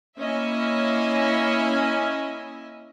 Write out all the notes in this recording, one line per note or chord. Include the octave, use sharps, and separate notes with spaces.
A#3 C#4 E4 D#5 E5 G#5